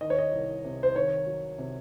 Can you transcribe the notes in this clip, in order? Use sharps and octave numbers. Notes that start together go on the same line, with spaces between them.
D#3 D#5
C#5
D#5
C2
C3
C5
D#3 C#5
F#3
C3